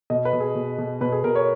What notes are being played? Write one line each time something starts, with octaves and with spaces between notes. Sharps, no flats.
B2 D#5
B4
B2
G#4
B2
B2
B2 B4
G#4
B2 A#4
C#5